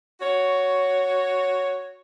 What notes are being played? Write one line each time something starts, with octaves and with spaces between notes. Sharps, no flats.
F#4 C#5